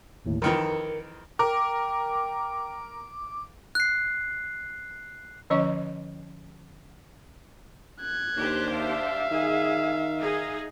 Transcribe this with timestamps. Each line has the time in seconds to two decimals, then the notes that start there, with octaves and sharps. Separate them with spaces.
0.25 G1 D#2 A2
0.42 F2 D#3 E3 A#4 C#7
1.39 A#4 G5 D6
3.75 F#6 C7
5.50 D3 F3 C#4 C#5 D#5 C#6
8.00 F#6 G#6
8.36 D#2 D4 G4 C5
8.72 E5 F5
9.31 D#3 G#4
10.19 D#4 G#4